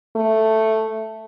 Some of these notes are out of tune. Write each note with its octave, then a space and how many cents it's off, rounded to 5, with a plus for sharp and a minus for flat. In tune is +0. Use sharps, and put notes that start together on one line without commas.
A3 +0